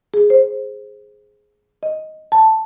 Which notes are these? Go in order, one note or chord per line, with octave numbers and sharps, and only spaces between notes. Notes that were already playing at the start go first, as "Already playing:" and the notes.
G#4
C5
D#5
A5